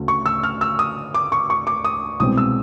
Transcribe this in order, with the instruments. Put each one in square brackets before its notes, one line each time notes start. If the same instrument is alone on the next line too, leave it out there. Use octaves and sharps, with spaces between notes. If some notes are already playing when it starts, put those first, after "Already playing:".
Already playing: [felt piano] D2 C#3 A3
C#6
E6
F6
E6
D#6
D6
C#6
C#6
D6
D#6
C2 B2 G#3 C4 D#6
E6